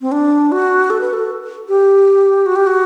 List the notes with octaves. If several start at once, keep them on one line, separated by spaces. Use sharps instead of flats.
C4
D4
F#4
A4
B4
A4
G4
F#4
G4
F#4